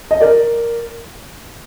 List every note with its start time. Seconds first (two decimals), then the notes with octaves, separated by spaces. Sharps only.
0.11 D#5
0.21 A#4 D5